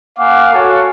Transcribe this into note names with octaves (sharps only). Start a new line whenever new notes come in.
A#3 F5 F#5 G#5 D6
F#4 A4 C#5 F5 G#5